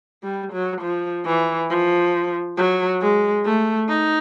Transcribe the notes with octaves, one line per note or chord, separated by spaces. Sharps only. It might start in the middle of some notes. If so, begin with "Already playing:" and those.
G3
F#3
F3
E3
F3
F#3
G#3
A3
D#4